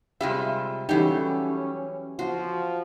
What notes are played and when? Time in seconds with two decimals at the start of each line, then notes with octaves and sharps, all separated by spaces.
0.21 C3 G3 G#3 F4 E5
0.89 E3 F#3 G3 A3 C#4 D#4 G4
2.19 F3 F#4 C6